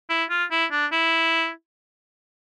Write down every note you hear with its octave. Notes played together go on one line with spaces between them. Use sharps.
E4
F4
E4
D4
E4